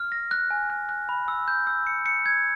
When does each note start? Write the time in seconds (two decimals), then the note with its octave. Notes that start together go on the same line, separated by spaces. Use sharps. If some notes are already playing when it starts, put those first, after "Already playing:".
Already playing: F6
0.12 A#6
0.31 F#6
0.51 G#5
0.70 F#6
0.89 F#6
1.09 B5
1.28 E6
1.48 G6
1.67 E6
1.87 C#7
2.06 C#7
2.26 G#6